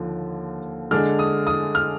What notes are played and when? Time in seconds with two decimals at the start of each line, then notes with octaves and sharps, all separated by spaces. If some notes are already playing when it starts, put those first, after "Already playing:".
Already playing: D#2 D3 F3
0.91 D3 G#3 D4 F6
1.19 D#6
1.47 D#6
1.75 F6